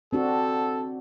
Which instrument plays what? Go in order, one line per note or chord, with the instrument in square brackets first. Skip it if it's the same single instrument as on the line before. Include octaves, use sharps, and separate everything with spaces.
[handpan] C4 D4 F#4 [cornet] A4